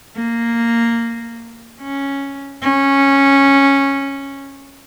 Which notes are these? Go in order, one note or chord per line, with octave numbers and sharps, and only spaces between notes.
A#3
C#4
C#4